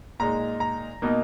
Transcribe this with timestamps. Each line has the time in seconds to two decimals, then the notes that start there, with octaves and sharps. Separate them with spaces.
0.20 A#2 G#3 D#4 A#5
0.60 A#5
1.02 B2 A#3 D#4